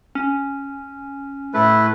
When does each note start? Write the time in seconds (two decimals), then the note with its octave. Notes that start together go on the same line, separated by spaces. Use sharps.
0.15 C#4
1.54 A2 A3 E4 B4